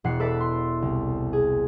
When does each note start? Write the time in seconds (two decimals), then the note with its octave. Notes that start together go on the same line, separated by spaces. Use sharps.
0.04 E1 F#5 C7 C#7
0.20 A4 B4 D5 E5
0.40 C6
0.82 C2
1.33 G#4